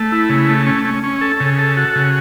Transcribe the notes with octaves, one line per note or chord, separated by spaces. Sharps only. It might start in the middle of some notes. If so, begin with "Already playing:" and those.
Already playing: A3
E4
C#3
A3
C#4
C#4
C#4
A4
C#3
A4
F#4
C#3